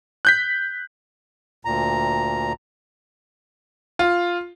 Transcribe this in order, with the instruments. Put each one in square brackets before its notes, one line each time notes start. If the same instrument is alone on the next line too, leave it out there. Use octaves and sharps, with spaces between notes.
[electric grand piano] F#6 G6 B6
[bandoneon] D2 A#2 A#5
[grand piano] F4